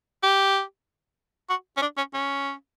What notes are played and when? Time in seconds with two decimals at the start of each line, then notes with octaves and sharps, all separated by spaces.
0.23 G4
1.50 F#4
1.77 C#4
1.82 D4
1.97 C#4
2.14 C#4